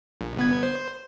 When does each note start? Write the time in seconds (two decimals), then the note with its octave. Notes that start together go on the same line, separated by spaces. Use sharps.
0.21 A#1
0.37 G1 B3 G#6
0.63 C5